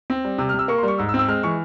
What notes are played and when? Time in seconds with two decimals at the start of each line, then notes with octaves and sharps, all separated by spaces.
0.10 C4
0.25 G3
0.38 C3 E6
0.49 F6
0.54 C3 E6
0.68 A#3 C#6
0.78 C6
0.83 G3 C#6
0.98 G#2 E6
1.09 E6
1.14 C4
1.19 E6
1.28 G#3 F6
1.43 E3 C#6